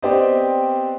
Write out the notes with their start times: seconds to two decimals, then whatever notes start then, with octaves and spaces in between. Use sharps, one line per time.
0.02 B3 C4 G4 C5 D5 D#5